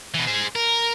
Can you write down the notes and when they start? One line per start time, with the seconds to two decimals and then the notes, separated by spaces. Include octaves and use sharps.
0.14 B2 E3
0.27 G#4 C5
0.55 A#4